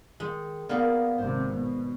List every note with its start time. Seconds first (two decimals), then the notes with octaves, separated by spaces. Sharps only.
0.20 D#3 G#3
0.69 A#3 B3 D#4 D5 F5
1.18 G#1 C3 C5
1.53 B2